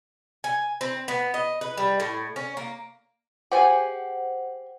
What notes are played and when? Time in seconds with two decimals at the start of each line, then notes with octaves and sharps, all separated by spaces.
0.44 G#5
0.81 C4
1.08 B3
1.34 D#5
1.61 B4
1.78 G3
2.00 A2
2.36 C#4
2.57 A#3
3.52 G4 G#4 C5 F#5 G#5